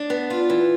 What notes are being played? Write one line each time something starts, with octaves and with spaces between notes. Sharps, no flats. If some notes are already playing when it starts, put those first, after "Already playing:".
Already playing: D4
B3
F4
E3